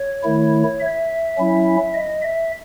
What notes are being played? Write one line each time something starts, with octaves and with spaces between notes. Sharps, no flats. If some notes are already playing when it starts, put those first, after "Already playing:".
Already playing: C#5
D#3 A3 E4
E5
F#3 C#4 E4
D#5
E5